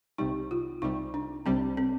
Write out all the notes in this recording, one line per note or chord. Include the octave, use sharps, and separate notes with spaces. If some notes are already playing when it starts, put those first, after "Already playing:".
C2 C3 G3 D#4
F4
C2 C3 G3 D#4
D4
C2 C3 G3 C4
C4